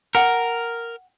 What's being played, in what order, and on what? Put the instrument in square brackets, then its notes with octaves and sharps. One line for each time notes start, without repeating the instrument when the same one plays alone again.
[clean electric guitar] A#4 [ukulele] F#5 G5